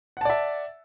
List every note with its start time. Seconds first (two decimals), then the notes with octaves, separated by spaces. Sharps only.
0.17 F#5
0.21 A5
0.25 D5
0.30 E5